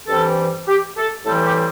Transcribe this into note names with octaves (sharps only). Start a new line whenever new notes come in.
G2 E3 G3 C4 A4
G4
A4
A2 E3 G3 C4 A4
G4